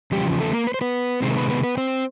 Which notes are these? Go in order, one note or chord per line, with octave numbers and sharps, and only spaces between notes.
E2 C#3 F3 G3 G4
A3 A4
A#3 A#4
B4
C5
B3 B4
C3 D#3 G#3 C4 C5
A#4
B3 B4
B3 B4
B3 B4
C4 C5